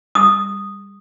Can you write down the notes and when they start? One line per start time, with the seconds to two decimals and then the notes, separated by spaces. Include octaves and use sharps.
0.15 D#6